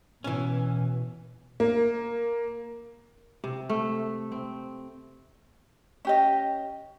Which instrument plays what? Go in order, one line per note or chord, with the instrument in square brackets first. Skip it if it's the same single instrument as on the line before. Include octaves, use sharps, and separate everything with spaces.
[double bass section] B2 [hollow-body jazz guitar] E3 C#4
[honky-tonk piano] A#3
[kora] C3
A3
C4
[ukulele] C#4 G4 D#5